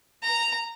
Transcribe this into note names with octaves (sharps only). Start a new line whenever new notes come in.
A#5